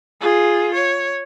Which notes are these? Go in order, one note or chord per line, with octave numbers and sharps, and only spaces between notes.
F4 G#4
C#5